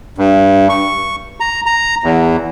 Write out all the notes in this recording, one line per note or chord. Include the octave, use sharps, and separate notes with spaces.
G2
C#6
A#5
A#5
E2